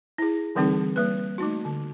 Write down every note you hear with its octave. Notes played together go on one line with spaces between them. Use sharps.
E4 G#4
D3 E3 G3 C4 D#4 G#4
G3 A#3 B4
A3 D#4 F#4
D3